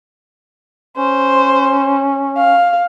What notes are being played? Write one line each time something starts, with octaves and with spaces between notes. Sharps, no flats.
C#4 C5
F5